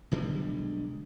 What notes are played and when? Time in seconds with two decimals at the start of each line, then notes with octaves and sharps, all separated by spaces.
0.11 B1 D3 G3 G#3